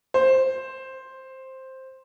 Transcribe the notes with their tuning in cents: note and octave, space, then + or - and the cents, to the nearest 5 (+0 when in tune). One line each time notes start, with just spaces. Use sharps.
C5 +5